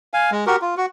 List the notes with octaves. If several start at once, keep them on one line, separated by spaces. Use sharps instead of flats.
F5 G#5
G#3
F#4 G4 A#4
F4
F#4